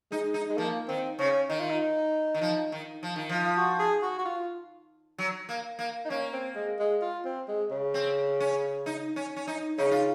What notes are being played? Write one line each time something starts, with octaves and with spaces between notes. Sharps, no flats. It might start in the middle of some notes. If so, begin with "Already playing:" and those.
G#3 D#4
D#4
G#3
F3 A#3
D#3 C4
C#3 C#4
D#3 D#4
F4
D#4
D#3
F3
D#3
F3
D#3
F3 F4
F#4
G#4
F#4
F#4
F4
F#3
A#3
A#3
D#4
A#3 C#4
C4
G#3
G#3
F4
C4
G#3
C#3
C4
C#4
D#4
C#4
C#4
D#4
C#3 D#4
F4